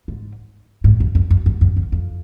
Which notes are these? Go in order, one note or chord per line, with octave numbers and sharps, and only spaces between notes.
G#2
G#2
F2
F#2
F#2
G2
F#2
F#2
F2